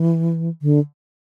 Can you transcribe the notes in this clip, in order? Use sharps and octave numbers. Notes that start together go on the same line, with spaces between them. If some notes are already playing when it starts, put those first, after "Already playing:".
Already playing: E3
D3